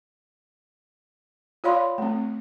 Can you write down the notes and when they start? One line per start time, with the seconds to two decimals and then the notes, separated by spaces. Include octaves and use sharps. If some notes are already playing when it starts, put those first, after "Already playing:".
1.64 F4 C#5 D5 F5 B5 C6
1.98 A3 C4